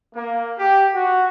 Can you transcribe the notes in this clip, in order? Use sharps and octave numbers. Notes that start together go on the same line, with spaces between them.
A#3
G4
F#4